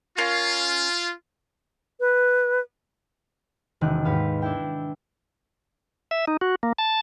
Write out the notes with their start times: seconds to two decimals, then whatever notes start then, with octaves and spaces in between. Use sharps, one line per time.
0.18 C#4 F4 A#4 F5
2.00 B4
3.81 E1 C3 D#3 F#6
4.05 D#2 G#2 B4 F5
4.42 D4 E4 G5
6.11 E5
6.27 D#4
6.41 F#4
6.63 A#3
6.78 A5